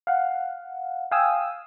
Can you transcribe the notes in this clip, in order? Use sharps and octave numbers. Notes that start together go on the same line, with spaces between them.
F5 F#5
F5 G5 G#5 D#6 E6